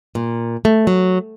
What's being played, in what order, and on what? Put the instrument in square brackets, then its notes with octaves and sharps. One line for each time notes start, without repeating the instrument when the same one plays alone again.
[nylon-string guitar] A#2
A3
F#3